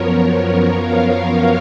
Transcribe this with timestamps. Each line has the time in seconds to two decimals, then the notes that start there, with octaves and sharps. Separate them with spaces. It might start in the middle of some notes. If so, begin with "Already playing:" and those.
Already playing: F#2 F3 B3 A#4 C#5
0.78 C#5 F5